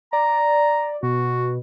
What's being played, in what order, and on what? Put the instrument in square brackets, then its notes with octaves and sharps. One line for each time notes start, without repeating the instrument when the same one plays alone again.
[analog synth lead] D5 [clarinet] A#5
[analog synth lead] B2 [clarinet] F#4